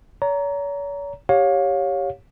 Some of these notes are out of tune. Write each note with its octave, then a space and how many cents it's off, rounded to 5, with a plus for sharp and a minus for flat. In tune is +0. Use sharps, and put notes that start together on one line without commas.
C#5 +40 A#5 +0
G4 +0 C#5 -5 F5 +30